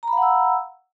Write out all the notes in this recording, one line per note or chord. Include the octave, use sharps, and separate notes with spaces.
F5 F#5 A#5 B5 E6